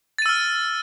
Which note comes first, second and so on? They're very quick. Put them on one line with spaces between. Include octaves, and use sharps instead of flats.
A6 D#7 E6 F6